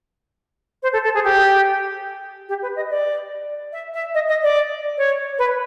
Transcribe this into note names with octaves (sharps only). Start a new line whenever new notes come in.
C5
A4
A4
G#4
G4
G4
B4
D#5
D5
E5
E5
D#5
D#5
D5
C#5
B4